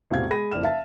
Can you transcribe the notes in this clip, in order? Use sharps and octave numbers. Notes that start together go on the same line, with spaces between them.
E1 A2 C3 F#4 F5 G#6
G#3 G#4 B5 A#6 D#7
F#1 F2 E4 D5 F6 E7
E5 F5 A5 A6